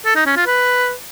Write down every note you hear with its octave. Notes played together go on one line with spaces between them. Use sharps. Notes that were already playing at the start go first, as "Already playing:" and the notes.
A4
D#4
C#4
F4
B4